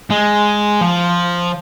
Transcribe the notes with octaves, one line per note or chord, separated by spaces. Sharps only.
G#3
F3